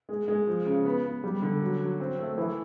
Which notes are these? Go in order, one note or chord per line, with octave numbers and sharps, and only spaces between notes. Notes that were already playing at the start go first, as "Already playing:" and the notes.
G#3
G#3
F3
C#3
B3
B3
G3
D3
F#3
F#3
C4
A3
E3